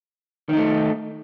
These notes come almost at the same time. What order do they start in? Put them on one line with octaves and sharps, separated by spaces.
D#3 D#4 A3